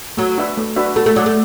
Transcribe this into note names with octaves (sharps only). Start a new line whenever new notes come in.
F#3 A3
D4 F#4 B4 E5
A3
D4 F#4 B4 E5
A3 F#4
A3
F#3 D5 F#5
A3